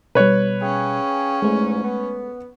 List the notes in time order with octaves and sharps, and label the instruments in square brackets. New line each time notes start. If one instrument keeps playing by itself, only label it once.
[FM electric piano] B2 G3 [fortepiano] B4 C#5
[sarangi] C#4 [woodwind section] G#4 F5 G5
[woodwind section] E2 G#2 [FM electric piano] G#3 A3
[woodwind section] B3